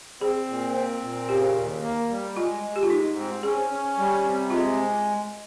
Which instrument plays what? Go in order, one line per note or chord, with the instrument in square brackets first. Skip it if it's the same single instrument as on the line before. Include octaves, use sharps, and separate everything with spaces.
[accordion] C4 [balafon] G#4
[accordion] A#2
C4
A#2
[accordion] C#3 [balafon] G4
[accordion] D#2
A#3
G3
[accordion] G#3 [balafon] F4
[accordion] G#3
[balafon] G4
F4
[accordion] G#2 [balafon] D#4
[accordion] C4
[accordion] C#4 [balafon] G#4
[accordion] C#4
G3
C3
[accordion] G#3 [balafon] F4